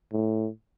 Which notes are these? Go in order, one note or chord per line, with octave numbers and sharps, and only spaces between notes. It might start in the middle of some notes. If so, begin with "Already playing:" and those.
A2